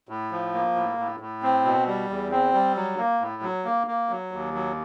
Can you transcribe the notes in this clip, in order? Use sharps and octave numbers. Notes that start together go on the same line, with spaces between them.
A2
F3
A#3
A2
A2
A2
C4
B2
G3
E2
C4
G3
F#3
A#3
A2
F#3
A#3
A#3
F#3
D#2
F#3